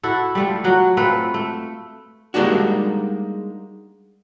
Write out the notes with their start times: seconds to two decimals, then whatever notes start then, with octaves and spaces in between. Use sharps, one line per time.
0.03 E4 F#4 A4
0.35 G3 A3 F4
0.64 F#3 F#4
0.97 A3 C4 F4 B4
1.34 A3
2.34 G3 G#3 A#3 D4 D#4 F#4